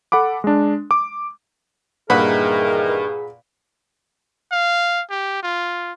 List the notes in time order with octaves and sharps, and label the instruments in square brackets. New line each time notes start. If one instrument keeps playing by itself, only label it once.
[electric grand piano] A4 F#5 B5 D6
G#3 D4
D6
[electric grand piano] G2 [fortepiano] A#2 B4 F#5 [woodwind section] D#3 E3 A#4 [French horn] G#4
[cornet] F5
G4
F4